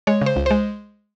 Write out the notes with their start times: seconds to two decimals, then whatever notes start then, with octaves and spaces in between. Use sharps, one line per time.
0.07 G#3 C#5
0.21 C#3 C5
0.36 C#2
0.46 G#3 C5